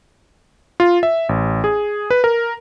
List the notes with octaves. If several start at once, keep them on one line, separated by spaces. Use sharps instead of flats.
F4
E5
A1
G#4
B4
A#4